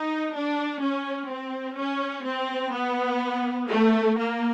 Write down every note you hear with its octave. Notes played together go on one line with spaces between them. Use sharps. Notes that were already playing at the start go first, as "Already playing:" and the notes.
Already playing: D#4
D4
C#4
C4
C#4
C4
B3
A3
A#3